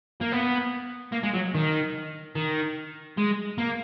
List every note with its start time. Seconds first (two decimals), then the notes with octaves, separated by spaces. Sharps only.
0.21 A#3
0.32 B3
1.13 A#3
1.24 G#3
1.34 F#3
1.55 D#3
2.36 D#3
3.17 G#3
3.58 A#3